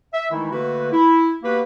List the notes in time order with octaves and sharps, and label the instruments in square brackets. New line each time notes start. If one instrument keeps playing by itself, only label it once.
[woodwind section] E5
D#3 E3 G#3 A3 D#4 E4
D3 A3 A#3 F#4 B4
E4
A#3 B3 F#4 G4 B4